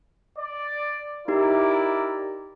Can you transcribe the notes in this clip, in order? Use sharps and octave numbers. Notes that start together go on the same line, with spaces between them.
D5
D#4 E4 G4 A#4 D5